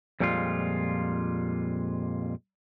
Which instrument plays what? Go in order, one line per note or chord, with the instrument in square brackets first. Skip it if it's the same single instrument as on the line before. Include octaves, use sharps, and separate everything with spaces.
[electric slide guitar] F2 A#2 G3 G#3 F4